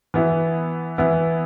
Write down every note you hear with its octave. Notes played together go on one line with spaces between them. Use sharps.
E3 B3 E4
E3 B3 E4